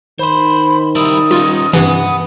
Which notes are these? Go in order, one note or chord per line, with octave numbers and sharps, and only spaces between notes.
D#3 C5 B5 C6
G3 E4 A#4 D#6
G3 C#4 D#4 F4
G2 C3 E3 B3